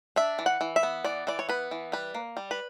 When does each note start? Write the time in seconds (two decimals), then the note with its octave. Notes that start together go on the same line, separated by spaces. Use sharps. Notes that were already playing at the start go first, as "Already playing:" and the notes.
0.16 D4 E5
0.39 E3
0.46 F#5
0.61 E3
0.76 E5
0.83 B3
1.04 E3 D5
1.27 E3 D5
1.39 C#5
1.49 B3 B4
1.71 E3
1.92 G3 B4
2.15 A#3
2.37 G3
2.51 B4